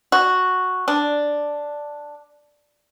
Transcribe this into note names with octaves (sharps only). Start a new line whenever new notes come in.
F#4
D4